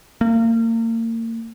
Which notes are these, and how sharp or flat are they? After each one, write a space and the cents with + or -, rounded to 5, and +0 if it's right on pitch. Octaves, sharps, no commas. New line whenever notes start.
A#3 -35